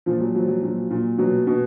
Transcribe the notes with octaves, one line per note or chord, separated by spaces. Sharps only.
A#2 F3
F#3
F3 F#3
F#3
A#2 F#3
A#2
B2 F#3
B2